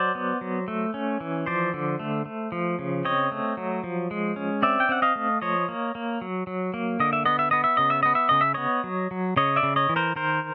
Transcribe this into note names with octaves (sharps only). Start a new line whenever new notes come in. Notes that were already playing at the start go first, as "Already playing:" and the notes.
Already playing: F#3 C5 D5
B3
F#3
A3
C#4
E3
F3 C5 D5
D3
A3
A3
F3
C#3
C4 C#5 D#5
A3
F#3
F3
G#3
C#4
C4 D5 E5
G5
C4 F#5
D#5 F5
A3
F3 C#5 D#5
A#3
A#3
F#3
F#3
A#3
D3 D#5
E5
B3 D#5
E5
B3 D#5
E5
C#3 D#5
E5
B3 D#5
E5
C#3 D#5
E5
B3 C#5 D#5
F#3
F#3
C#3 C#5 D#5
D5 E5
C#3
C#5 D#5
E3
A#4 C5
D#3 A#4 C5